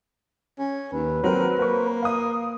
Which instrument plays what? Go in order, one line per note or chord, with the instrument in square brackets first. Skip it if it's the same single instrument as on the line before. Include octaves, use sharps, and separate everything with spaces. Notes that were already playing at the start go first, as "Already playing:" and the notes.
[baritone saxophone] C#4
[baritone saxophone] D#2 [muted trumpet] B4
[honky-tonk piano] F#3 A#4 [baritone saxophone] C4
[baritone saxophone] A#3 [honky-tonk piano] C5 C#6
[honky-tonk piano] F5 D#6